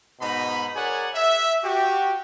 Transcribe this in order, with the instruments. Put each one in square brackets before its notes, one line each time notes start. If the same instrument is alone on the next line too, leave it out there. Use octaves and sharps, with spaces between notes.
[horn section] G#2 B2 D#4 D#5 B5
G#4 A#4 C#5 D5 F#5 G#5
E5
F#4 G4